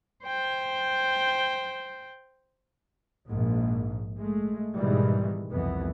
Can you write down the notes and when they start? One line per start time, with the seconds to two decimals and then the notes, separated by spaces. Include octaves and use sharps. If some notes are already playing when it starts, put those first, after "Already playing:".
0.24 C5 G5
3.28 A#1 G#2
4.19 G#3 A3
4.75 G#2 B2 D#3 E3 G3 G#3
5.51 C2 F2 E3 B3